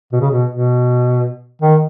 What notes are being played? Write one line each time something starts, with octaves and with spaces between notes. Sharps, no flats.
B2
C#3
B2
B2
D#3